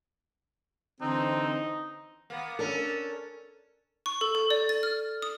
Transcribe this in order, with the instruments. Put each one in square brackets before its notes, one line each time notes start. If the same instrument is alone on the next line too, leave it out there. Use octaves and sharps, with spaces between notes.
[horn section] D3 E3 C4 [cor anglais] D#4
[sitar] A#3 B3
[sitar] C#4 D4 A4 [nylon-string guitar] A#4
[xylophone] C#6
A4
A4
D5
A6
F6
D#6